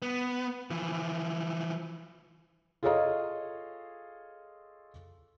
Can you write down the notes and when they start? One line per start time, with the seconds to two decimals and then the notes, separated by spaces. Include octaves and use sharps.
0.02 B3
0.70 E3 F3
2.83 F4 G#4 A4 C#5 D#5 F5